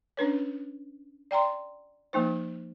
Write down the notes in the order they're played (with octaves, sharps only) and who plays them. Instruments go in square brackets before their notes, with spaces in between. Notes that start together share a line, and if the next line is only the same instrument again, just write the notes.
[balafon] C#4 D4 B4 C#5
D5 G5 A#5 C6
F3 A#3 D#4 C5